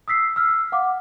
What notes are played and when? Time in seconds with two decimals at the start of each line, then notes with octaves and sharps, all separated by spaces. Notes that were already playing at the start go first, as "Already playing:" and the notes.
0.08 D#6 E6 B6 C7
0.36 E6 F6
0.72 F5 F#5 D6